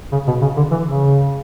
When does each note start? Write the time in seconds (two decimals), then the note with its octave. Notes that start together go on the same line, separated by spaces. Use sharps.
0.12 C#3
0.27 B2
0.42 C#3
0.57 D3
0.71 E3
0.86 C#3